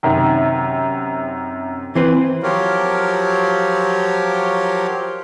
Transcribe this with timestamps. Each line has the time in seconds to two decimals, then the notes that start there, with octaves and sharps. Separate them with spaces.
0.03 F#2 C3 D#3
1.95 E3 C4 B4
2.43 F3 F#3 F4 G4 A#4 C#5